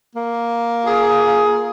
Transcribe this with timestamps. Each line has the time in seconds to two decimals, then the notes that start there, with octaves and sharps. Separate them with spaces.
0.15 A#3
0.85 F4 G#4